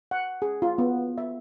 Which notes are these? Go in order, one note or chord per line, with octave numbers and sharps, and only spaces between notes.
F#5
G#4
F4
B3
E5